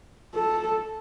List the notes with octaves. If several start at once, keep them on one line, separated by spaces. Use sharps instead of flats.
A4